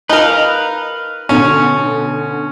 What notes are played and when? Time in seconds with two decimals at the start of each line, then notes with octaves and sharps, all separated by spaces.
0.09 D#4 A#4 B4 F5
1.29 B2 D3 C#4